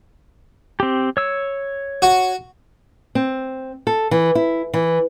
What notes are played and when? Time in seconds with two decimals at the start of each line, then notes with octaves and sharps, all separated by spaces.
0.80 C4 G4
1.17 C#5 E6
2.02 F#4
3.15 C4
3.87 A4
4.11 E3
4.35 E4
4.74 E3